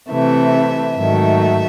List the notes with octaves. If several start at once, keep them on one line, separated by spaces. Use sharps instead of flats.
C3 E3 A3 E5
G#2 D#3 F#3 A3 E5